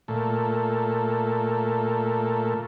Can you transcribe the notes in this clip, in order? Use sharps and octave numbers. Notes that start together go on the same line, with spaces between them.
A#2 A3